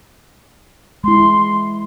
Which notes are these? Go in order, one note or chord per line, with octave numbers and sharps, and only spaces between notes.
G#3 E4 C6